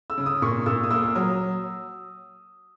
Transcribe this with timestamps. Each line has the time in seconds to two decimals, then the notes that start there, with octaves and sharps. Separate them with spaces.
0.10 E6
0.18 C#3
0.26 D#6
0.42 A#2 C#6
0.66 A#2 E6
0.83 D#6
0.91 A#3 E6
1.15 F#3 D#6